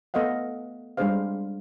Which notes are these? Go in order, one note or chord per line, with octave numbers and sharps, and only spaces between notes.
A3 B3 A4 D#5 F5 F#5
G3 G#3 D4 G#4 C5 F5